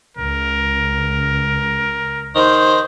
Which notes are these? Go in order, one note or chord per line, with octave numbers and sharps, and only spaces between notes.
C#2 A#4
D#3 C5